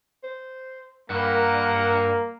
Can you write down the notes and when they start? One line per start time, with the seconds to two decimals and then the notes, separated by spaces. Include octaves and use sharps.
0.24 C5
1.10 G2 A#3 A#4 F#5